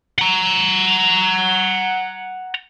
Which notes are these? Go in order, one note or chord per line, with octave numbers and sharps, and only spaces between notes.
F#5 A#5